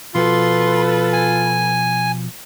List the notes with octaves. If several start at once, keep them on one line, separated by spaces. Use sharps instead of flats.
B2 F3 F4 F#4 A4 B4 C6
G#5